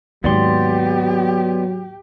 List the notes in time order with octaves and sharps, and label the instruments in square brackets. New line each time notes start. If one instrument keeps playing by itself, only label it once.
[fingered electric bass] D#2 G#2 [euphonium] F#3 [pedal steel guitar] B3 D5 C6 [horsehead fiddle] G4